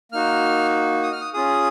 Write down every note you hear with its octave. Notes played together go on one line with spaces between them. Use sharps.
A#3 D#4 F#4 F6
D#6
F6
D#6
C#4 F4 G#4 D#6